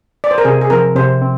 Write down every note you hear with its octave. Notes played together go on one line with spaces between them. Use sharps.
D5
C5
A#4
C3 G#4
G#4
F3 C4 A#4
C3 C5
C4